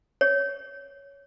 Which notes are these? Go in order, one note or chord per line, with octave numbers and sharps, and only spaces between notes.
C#5